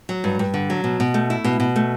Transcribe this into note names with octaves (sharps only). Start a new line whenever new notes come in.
F#3
G2
G2
D3
F#3
B2
B2
A3
E4
B2
B2
A3